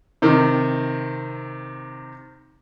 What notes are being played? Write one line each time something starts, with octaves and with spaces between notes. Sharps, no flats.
C3 D#3